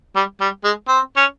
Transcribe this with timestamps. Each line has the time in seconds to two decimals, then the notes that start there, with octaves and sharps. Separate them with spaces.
0.16 G3
0.41 G3
0.64 G#3
0.88 C4
1.16 C#4